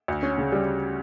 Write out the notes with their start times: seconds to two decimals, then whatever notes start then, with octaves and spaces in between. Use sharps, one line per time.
0.08 D2
0.23 C#4
0.38 C#3
0.52 G3